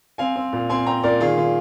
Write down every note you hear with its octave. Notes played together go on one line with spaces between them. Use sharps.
C4 F5 G#5
C4
A#2
C4 G#5 C6
C4 G5 A#5
A#2 A#4 D5
D#3 F4 G#4
D#3 F4